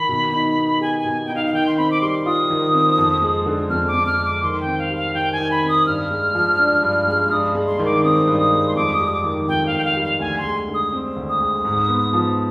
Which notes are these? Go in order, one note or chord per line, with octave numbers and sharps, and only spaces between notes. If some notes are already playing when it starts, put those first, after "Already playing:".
Already playing: D#3 B5
B2
D#4
B3
G4 G#5
G#5
B2
D#4 G5
F5
F5
D#3 G5
C6
C4 B5
D6
G3 C6
F4 D#6
D#3
C4
F2
G#3
D3
F2 F6
D6
F2
F6
G#3
D6
D#3 C6
G5
C4
F5
G3
F5
D#3 G5
G#5
D#3
B5
C4
D#6
G2 F6
G#3
F3
D4
G2
G#3
G2 D#6
G#3
C6
D#3
D6
C4 D#6
G2
D#6
G#3
C6
F2 D6
D#6
G3
D#6
D6
D#3
F2 G5
F5
F2
G5
F5
G3
F5
D2 G#5
C6
G#3
D3
D#6
C4
D2
D#6
G#3
G#2
B3
F3